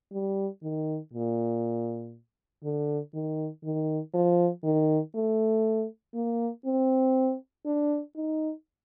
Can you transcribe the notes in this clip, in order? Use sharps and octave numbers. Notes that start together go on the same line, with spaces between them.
G3
D#3
A#2
D3
D#3
D#3
F3
D#3
A3
A#3
C4
D4
D#4